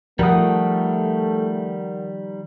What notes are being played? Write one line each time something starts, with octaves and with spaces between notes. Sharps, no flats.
D#3 F3 G3 A3 A#4 F#5 D#6